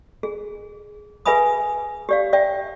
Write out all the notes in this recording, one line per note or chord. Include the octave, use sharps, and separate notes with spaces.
G#4
G#4 B4 E5 G#5 B5 D#6
G4 D5 F5
D5 E5 G5